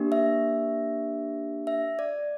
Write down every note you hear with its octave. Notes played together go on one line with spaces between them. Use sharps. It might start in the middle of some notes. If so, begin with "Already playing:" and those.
Already playing: A#3 D4 G4
E5
E5
D5